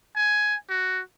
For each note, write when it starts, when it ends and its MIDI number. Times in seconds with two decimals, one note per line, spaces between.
0.16 0.56 80
0.69 1.01 66